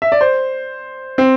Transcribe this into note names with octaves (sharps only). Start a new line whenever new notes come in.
E5
D5
C5
C4